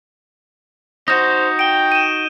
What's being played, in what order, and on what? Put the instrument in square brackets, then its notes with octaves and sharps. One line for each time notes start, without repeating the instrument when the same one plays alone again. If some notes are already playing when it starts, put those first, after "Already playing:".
[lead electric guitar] D#4 F#4 [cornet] C5 [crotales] D#6 G6
[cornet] G5 [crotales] D7 G7
[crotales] D#7 E7